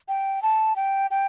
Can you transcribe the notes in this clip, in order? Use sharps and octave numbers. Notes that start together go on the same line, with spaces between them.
G5
A5
G5
G5